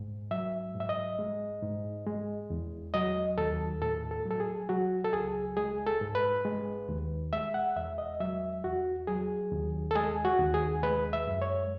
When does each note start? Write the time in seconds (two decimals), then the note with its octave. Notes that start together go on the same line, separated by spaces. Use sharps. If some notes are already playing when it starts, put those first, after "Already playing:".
Already playing: G#2
0.31 F#3 E5
0.75 G#2
0.80 E5
0.89 D#5
1.19 G#3
1.62 G#2
2.06 G#3
2.50 E2
2.94 F#3 D#5
3.38 D#2 A4
3.82 A2 A4
4.11 A4
4.25 F#3
4.31 A4
4.40 G#4
4.69 F#3 F#4
5.04 A4
5.13 C#2 G#4
5.57 G#3 G#4
5.86 A4
6.01 G#2
6.15 B4
6.45 G#3
6.89 D#2
7.33 G#3 E5
7.54 F#5
7.76 E2 E5
7.98 D#5
8.20 F#3 E5
8.64 E2 F#4
9.07 F#3 G#4
9.52 D#2
9.91 A4
9.95 G#3 G#4
10.25 F#4
10.40 D#2
10.54 G#4
10.83 G#3 B4
11.13 E5
11.27 F#2
11.42 C#5